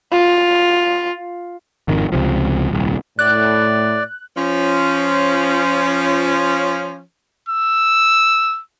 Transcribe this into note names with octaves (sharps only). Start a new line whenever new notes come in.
F4
G#1 F2 D#3
C#2 C3 F3
D#1 C2
A2 D5 F#6
F3 C#4
E6